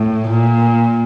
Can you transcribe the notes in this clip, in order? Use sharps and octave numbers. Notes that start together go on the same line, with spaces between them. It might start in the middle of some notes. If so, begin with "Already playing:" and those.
Already playing: A2
A#2